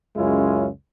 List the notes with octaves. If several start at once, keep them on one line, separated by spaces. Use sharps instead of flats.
C#2 F#2 G#3 C#4 E4 F4